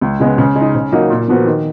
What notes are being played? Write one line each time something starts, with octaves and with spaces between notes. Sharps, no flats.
C#2
C#3 G#3 B3
C#3
G#3
D#4
C#3
F#3 A#3 D#4
A#2
F3 B3 F#4 A#4
D#3